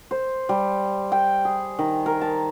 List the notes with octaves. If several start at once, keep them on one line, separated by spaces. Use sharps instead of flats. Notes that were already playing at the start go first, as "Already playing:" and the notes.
C5
G3
G5
G#4
D#3
A#4
A5